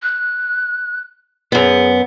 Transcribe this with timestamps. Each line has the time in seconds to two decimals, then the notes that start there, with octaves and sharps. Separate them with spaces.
0.02 F#6
1.52 F#2 B3 G#4